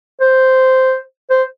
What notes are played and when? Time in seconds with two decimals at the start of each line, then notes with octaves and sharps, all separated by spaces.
0.21 C5
1.30 C5